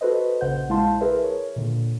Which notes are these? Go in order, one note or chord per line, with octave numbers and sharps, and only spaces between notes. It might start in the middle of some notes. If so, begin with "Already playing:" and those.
F#4 A4 B4 C5 D#5
A#1 C#3 C5 F#5 G6
A#1 G#3 E4 F5 A5 C6
G#4 A#4 B4 E5
C#5
A#2 D3